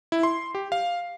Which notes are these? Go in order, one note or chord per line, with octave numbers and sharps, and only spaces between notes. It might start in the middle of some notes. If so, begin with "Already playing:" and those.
E4
C6
G4
F5